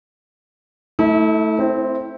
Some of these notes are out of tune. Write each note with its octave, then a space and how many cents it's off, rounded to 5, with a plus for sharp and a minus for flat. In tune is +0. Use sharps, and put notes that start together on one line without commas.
A3 +0 E4 -40
C4 +0 E4 +0